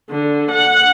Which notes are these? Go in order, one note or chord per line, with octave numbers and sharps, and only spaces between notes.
D3
F#5